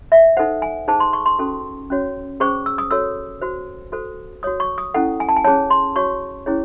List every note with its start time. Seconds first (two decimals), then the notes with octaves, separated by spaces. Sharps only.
0.12 E5
0.37 D#4 A4 C5 F#5
0.62 G#5
0.88 D#4 G#4 C5 A5
1.00 C6
1.13 C#6
1.26 C6
1.39 C#4 F#4 A4
1.90 C#4 F#4 C#5
2.40 C#4 G#4 C5 C#6
2.66 E6
2.78 D#6
2.91 F#4 A4 C#5 E6
3.42 F#4 C5
3.92 F#4 A4 C5
4.43 F#4 C#5 D#6
4.60 C#6
4.78 D#6
4.94 C#4 E4 A4 F#5
5.20 G#5
5.29 A5
5.36 G#5
5.44 C#4 G#4 C#5 A5
5.70 C6
5.96 F#4 C#5 C#6
6.46 C#4 E4 G#4 C#5